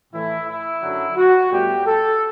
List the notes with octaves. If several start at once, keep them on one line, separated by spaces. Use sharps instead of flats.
A2 E3 A3 E4
E4
F#2 D3 F#3
F#4
A2 G3 B3 G4
A4